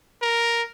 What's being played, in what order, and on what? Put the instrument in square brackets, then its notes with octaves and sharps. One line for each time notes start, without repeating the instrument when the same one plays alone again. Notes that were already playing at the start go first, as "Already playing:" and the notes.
[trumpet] A#4